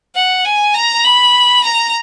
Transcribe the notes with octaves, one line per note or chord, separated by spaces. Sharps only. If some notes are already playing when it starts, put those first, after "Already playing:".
F#5
G#5
A#5
B5
A#5